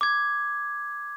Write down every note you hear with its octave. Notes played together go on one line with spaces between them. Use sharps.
D6 G#6